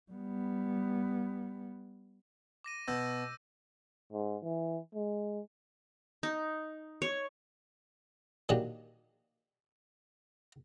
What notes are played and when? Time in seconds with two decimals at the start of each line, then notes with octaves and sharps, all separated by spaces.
0.11 G3 B3
2.64 D6 A#6 D#7
2.88 B2 E6 G6 A#6
4.13 G#2
4.43 E3
4.95 G#3
6.23 D#4
7.02 C#5
8.49 A#2 D#3 F#3 D4 G4